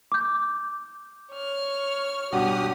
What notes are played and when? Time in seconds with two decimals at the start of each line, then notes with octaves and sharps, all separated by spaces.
0.12 D6 G6
1.33 C#5 F6
2.33 G2 B2 G4 F#5 D#6